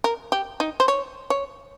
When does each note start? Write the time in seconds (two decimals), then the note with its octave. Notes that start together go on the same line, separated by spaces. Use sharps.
0.04 A#4
0.32 G4
0.60 D#4
0.80 C5
0.88 C#5
1.30 C#5